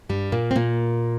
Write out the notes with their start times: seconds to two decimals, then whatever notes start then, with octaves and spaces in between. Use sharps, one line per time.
0.09 G2 G3
0.32 A#2 A#3
0.51 C4
0.56 A#2 A#3